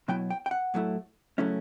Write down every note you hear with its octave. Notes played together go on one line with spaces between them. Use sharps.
B2 F#3 B3 E4 G5
G5
G5
F#5
A2 F#3 A3 E4
C#3 F#3 A3 C#4 E4